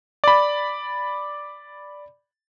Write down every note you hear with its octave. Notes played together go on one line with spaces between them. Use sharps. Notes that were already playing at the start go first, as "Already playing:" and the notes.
D5 B5